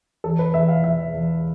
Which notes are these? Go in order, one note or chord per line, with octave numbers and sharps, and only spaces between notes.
E2 A4
B4
E2 E5
F5
E2 E5
E2